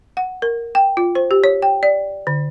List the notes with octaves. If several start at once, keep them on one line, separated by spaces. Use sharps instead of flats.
F#5
A#4
G5
F4
C5
G4
C#5
G5
D5
D3